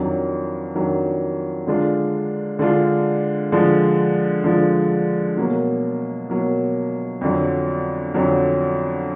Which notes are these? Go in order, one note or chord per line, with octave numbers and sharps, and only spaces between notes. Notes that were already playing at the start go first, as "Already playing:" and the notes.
Already playing: F2 D#3 F#3 D4
F2 D#3 F#3 D4
D3 G#3 D4 F4
D3 G#3 D4 F4
D3 F3 G#3
D3 F3 G#3
B2 F#3 A#3
B2 F#3 A#3
F2 D3 F#3
F2 D3 F#3